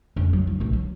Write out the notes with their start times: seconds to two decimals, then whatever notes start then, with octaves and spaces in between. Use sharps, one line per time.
0.16 F2 C#4
0.33 F#3
0.47 E4
0.60 B1 A2
0.73 F#3